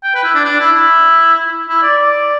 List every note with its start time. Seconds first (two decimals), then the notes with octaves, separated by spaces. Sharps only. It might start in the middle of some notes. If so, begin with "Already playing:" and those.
0.03 G5
0.15 B4
0.24 E4
0.35 D4
0.45 D4
0.60 E4
0.73 E4
1.69 E4
1.83 D5
1.97 D5